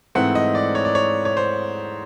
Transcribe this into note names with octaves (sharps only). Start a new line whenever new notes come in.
G#2 E3 A3 C4 F#5
D#5
D5
C#5
D5
C#5
C#5
C5